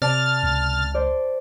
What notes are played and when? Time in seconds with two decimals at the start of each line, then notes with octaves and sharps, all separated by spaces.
0.02 C3 D5 A5 F6 A6
0.43 C#2
0.94 C5 D5